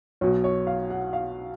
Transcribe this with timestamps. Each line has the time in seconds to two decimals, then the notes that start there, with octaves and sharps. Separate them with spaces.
0.21 B1 B2 C#5
0.44 C#5
0.67 F5
0.90 F#5
1.13 F5